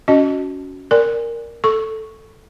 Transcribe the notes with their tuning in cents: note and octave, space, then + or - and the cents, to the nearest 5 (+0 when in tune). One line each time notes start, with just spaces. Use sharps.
C#4 +20 F#4 +0 D#5 +0
A#4 +0 D5 +0 G#5 -20
A4 +0 C#6 +0